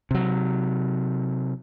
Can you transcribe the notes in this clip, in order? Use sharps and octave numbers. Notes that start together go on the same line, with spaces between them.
C3 F#3